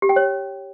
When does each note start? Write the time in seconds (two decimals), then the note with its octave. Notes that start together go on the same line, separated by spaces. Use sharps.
0.02 G4
0.09 G5
0.16 C#5